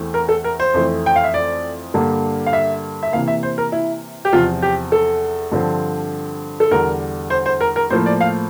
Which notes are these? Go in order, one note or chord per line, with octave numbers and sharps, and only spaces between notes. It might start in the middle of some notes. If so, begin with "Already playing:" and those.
Already playing: E2 E3 A3 C4
A#4
A4
A#4
C5
F2 E3 A3 C4
G5
F5
E5
D5
G2 D3 G3 A#3
F5
E5
E5
C3 E3 A#3 F5
E5
C5
A#4
E4
G4
E2 C3 F3 F4
G4
A4
G2 D3 F3 C4
A4
E2 D3 G3 A#4
C5
C5
A#4
A#4
A2 F3 A#3 C5
D5
F5